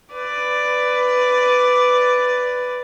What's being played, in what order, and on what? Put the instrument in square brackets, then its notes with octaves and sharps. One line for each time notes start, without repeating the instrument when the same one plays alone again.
[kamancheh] B4 D5